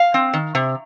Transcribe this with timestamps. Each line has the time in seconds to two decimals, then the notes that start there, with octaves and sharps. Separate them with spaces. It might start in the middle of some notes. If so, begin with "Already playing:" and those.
Already playing: F5
0.14 C4
0.33 D#3
0.55 C3